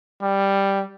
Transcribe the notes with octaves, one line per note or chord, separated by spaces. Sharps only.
G3